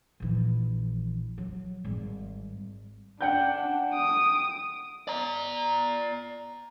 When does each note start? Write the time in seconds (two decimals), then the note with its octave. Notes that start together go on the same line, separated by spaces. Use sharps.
0.20 A#1 E3
1.38 F#3
1.84 G#1 G3
3.21 D4 F#5 G5 G6
3.93 D#6 D7
5.08 D5 A#5